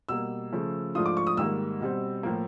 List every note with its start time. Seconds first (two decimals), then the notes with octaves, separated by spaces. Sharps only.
0.09 B2 G3 A#3 E6
0.52 C#3 F3 A3
0.95 G#2 F3 A3 D4 F4 D#6
1.06 D6
1.17 C#6
1.27 D#6
1.37 G#2 D#3 G3 A#3 E6
1.81 B2 G3 C4
2.23 A2 F3 A#3